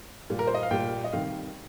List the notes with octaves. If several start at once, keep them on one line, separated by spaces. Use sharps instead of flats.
A#2 G3
A#4
C5
D#5
F5
A#2 G3 G5
D#5
C3 D#3 G3 F5